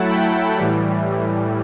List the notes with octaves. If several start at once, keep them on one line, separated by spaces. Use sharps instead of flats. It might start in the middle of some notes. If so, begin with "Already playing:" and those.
Already playing: F#3 A3 E4 F#5 A5
G5 B5
A2 E3 G3